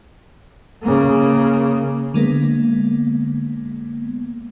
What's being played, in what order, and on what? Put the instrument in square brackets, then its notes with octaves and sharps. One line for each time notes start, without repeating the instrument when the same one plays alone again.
[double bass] C#3 A#3
[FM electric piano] D3 G#3 A#3 B3